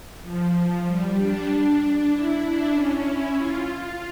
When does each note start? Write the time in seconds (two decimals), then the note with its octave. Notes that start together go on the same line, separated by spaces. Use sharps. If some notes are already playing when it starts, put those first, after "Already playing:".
0.22 F3
0.86 G3
1.16 D4
1.80 D4
2.11 E4
2.41 D4
2.73 C#4
3.04 E4
3.36 F4